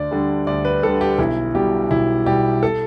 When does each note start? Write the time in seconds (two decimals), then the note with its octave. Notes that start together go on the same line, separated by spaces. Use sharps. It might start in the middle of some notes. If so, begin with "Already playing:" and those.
Already playing: D2 D5
0.11 D3 G3
0.47 D2 D5
0.65 B4
0.83 D3 G3 A4
1.01 G4
1.18 B1 E4
1.54 B2 G3 G4
1.91 B1 E4
2.26 B2 G3 G4
2.63 A4